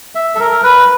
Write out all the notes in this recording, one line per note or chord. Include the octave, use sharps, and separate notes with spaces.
E5
A4
A#4
B4